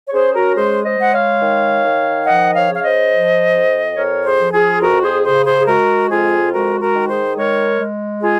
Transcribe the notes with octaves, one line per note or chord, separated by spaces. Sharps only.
C#5
C#4 G#4 C5
F#4 A#4
G#3 G#4 C5
C5 D#5
G#3 F#5
C#5 F5
D#3
D#3
F3 D#5 F#5
C#5 F5
C#3
F5
C5 D#5
F3
F2
F2 A#4 C#5
G#4 C5
F3
F4 G#4
F2 F#4 A#4
G#4 C5
C#3 G#4 C5
G#4 C5
G#4
G#3 F#4 A#4
F2 F4 G#4
G#3 F#4 A#4
F#4 A#4
D#3
G#4 C5
G#3 A#4 C#5
G#3
F4 G#4